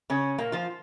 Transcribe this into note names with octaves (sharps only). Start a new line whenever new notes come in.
C#3 C#4
A#2 A#3
F3 F4